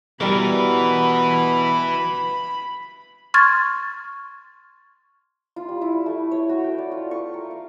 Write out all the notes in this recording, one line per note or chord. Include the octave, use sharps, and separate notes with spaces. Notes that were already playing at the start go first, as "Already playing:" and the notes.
B2 E3 G3 A#4 B5
C6 C#6 F6 G#6 A6
F4
G3
E4
A3
C#5
F#4
G5
D5
F4
C#6
A#4
F5